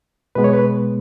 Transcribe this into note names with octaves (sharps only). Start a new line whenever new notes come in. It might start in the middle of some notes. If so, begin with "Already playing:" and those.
B2 G#3 B3 B4
C#5
B4